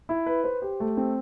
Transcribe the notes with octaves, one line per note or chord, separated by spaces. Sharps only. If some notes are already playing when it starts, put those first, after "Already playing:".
E4
B4
C5
G4
A3
C4